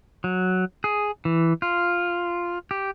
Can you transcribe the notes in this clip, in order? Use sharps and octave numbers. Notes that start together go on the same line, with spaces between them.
F#3
G#4
E3
F4
G4